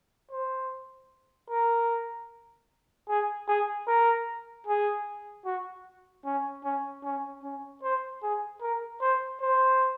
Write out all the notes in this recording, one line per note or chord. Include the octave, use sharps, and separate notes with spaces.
C5
A#4
G#4
G#4
A#4
G#4
F#4
C#4
C#4
C#4
C#4
C5
G#4
A#4
C5
C5